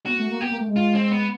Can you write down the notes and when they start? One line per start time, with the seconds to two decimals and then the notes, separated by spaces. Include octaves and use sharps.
0.06 B3 F#4
0.18 A3
0.30 A#3
0.41 B3 G4
0.50 A#3
0.59 A3
0.68 G#3
0.76 F4
0.95 C4
1.11 B3